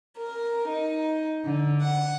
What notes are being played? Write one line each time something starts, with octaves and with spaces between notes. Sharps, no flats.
A#4
D#4
D3
F#5